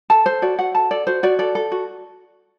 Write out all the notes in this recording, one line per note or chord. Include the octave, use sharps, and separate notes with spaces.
A4 A5
A4 C5
F#4 D5
F#4 F#5
A4 A5
A4 D5
F#4 C5
F#4 D5
A4 D5
A4
F#4